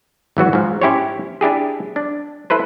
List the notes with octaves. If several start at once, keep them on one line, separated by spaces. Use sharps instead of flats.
G#1 E3 F#3 F#4
G#2 F3
C#4 E4 G4 C5 C#5
D4 E4 G4 G#4
D4
E4 A4 B4 C5